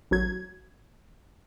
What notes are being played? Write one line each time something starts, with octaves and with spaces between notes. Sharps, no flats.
A1 F#3 G#6